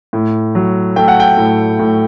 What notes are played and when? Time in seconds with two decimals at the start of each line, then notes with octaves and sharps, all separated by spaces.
0.13 A2
0.55 F#3
0.96 A3 G5
1.08 F#5
1.20 G5
1.37 A2
1.79 A2